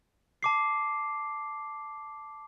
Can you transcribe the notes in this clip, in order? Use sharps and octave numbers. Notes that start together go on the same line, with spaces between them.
A5 D6 C7